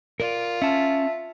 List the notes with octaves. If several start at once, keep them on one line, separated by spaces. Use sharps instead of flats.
F4 A#4 D5
C#4 E5 A5